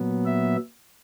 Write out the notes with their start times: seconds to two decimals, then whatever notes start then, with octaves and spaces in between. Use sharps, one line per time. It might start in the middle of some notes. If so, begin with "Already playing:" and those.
Already playing: A#2 F#3 B3
0.25 E5